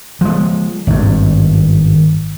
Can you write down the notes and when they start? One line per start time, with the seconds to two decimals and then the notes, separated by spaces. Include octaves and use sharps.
0.21 F3 G#3
0.87 G#1 G2